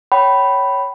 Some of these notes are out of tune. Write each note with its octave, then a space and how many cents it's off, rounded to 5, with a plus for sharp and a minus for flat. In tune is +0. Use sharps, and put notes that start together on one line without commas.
C#5 +0 G5 -30 B5 +0